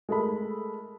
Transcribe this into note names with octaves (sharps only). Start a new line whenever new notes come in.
G#3 A3 A4 A#4 B5